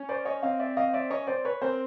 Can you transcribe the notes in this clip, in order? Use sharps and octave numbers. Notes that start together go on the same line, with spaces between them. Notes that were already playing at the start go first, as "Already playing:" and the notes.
Already playing: C#4
C5 D5
C#5 D#5
C4 D#5 F5
D5 E5
D#5 F5
D5 E5
C#4 C#5 D#5
C4 C5 D5
B4 C#5
C4 A#4 C5